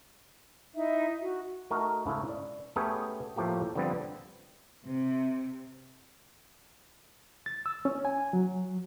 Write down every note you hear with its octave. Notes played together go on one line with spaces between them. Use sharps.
D#4 E4 E5
F#4
A3 D#4 F#4 A#4
G#2 C#3 A3 C#4 E4
D5
A3 B3 C#4 G4 G#4
A2 F3 A3 A#3 G4
D3 F3 G3 B3 C4
C3
A6
E6
C#4
G#5
F#3